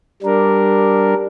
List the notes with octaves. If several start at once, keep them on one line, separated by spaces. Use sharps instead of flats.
G3 D4 A#4